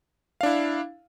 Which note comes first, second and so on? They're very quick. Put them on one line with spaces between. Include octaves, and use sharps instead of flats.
F5 D4 E4